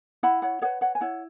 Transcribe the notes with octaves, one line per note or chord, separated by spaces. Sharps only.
E4 F#5 B5
C#5 F#5
G#4 B4 C#5 F#5
C#5 F#5
G#5
E4 C#5 F#5